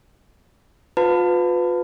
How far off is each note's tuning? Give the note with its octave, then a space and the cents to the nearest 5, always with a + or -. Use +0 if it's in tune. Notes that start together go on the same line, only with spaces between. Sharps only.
F4 +35 B4 +20 A5 +25